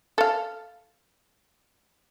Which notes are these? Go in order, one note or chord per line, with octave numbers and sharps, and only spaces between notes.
A4 F5